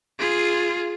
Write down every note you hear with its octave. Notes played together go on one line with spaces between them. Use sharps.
F4 G#4